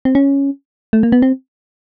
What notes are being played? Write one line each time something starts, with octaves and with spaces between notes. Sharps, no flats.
C4
C#4
A3
A#3
B3
C4